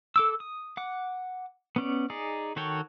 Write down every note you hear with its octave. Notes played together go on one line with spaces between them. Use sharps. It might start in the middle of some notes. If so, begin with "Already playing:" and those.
A4 D6 E6
D#6
F#5 D6
B3 C#4 D5
D#4 G#4 D5
D#3 F#4 A4 C#5 G5